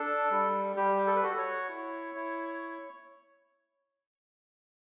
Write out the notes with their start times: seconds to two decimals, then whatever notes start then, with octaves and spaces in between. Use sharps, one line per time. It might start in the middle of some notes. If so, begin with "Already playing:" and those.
Already playing: D4 A4
0.31 G3
0.76 G3 G4
1.07 A4
1.16 B4
1.23 F#4 A4
1.38 C#5
1.68 E4
2.15 E4